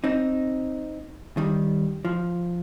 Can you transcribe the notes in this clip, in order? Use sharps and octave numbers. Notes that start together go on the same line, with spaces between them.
C4 D#4
D#3 G3
F3